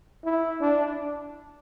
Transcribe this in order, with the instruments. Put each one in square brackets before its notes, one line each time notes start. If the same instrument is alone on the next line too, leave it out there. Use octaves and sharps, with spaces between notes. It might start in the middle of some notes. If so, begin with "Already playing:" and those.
[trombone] E4
D4